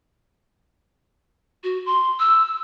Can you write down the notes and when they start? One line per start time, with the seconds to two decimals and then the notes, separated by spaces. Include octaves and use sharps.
1.64 F#4
1.86 C6
2.20 E6